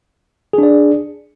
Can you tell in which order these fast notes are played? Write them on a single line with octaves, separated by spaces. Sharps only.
G#4 D4 D5